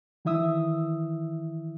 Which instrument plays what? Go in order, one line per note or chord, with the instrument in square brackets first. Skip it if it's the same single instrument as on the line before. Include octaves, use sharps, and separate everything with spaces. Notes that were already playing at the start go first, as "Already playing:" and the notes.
[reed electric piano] D#3 E3 E4 E5 D#6 E6